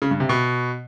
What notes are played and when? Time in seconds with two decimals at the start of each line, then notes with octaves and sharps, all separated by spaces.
0.02 C#3
0.11 G2
0.20 C3
0.29 B2